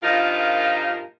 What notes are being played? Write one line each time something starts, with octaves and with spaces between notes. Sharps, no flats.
G2 A#2 F3 D#4 F4 A#4